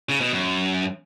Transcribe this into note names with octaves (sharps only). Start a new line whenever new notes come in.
C#3
B2
F#2